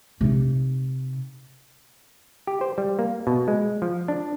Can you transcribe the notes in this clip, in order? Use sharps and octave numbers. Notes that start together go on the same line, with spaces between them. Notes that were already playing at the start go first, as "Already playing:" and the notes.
C3 D#4
G4
C5
G3
A#3
B2
G#3
F3
D4